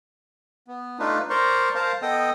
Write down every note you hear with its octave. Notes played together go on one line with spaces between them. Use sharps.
B3
A3 D4 D#4 F4 B4
A#4 C5 D5 A#5 C6 C#6
A#4 C5 F5 A5 A#5
B3 A4 D#5 G5 D#6